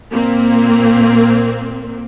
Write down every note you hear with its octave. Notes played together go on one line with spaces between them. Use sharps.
A#2 A#3 C4